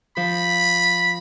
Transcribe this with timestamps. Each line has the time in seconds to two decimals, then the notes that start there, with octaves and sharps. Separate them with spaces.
0.17 F3 B5